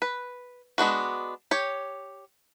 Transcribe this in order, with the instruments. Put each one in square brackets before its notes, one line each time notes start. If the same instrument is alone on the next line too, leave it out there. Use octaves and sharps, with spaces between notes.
[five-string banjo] B4
G#3 B3 D4 F#4
G4 C#5